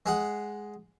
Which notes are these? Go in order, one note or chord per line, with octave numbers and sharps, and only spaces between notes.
G#3 G#4 F#5